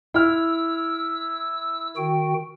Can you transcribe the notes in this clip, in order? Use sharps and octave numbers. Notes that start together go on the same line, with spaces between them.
E4 E6 F6
D#3 F#4 G5